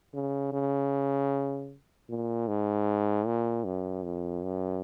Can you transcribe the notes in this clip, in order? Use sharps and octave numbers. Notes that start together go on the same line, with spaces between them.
C#3
C#3
A#2
G#2
A#2
F#2
F2
F#2